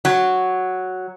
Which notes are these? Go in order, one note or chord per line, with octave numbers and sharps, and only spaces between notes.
F#3